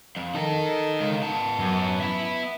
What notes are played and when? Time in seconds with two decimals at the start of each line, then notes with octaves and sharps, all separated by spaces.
0.16 F2
0.35 D#4 A4 A#4
1.00 C#2
1.22 B3 A5
1.59 F#2
2.00 E5 B5